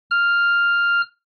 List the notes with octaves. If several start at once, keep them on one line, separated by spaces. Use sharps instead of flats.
F6